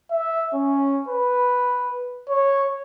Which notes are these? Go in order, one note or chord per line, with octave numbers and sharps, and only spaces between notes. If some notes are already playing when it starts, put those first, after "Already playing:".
E5
C#4
B4
C#5